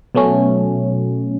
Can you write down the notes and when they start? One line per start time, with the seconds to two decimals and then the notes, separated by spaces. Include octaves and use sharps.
0.15 B2 F#3 A3 C#4